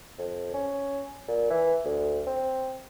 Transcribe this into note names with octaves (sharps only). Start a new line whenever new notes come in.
F2
C#4
A#2
E3
D2
C4